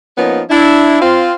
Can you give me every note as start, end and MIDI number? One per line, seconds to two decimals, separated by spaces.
0.17 0.42 53
0.17 0.42 58
0.17 0.42 59
0.17 0.42 61
0.17 0.42 63
0.50 1.00 62
0.50 1.00 64
1.02 1.32 60
1.02 1.32 65